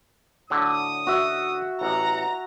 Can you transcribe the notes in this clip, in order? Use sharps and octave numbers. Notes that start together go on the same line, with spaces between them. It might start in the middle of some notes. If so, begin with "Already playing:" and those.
A2 D3 F#3 D#6
F#4 E5
A1 F#5 A#5